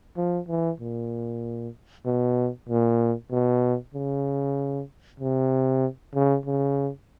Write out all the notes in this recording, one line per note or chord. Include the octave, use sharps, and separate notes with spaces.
F3
E3
A#2
B2
A#2
B2
C#3
C3
C#3
C#3